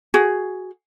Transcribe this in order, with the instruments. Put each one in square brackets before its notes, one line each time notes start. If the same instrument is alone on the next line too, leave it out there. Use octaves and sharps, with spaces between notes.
[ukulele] F#4 G#4